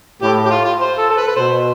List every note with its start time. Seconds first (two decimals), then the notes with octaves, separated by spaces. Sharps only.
0.22 A2 G4
0.46 G4
0.50 F4
0.64 F4
0.80 C5
0.98 A4
1.10 A4
1.17 B4
1.27 B4
1.36 B2 C5